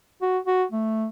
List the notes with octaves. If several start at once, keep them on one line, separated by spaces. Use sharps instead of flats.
F#4
F#4
A3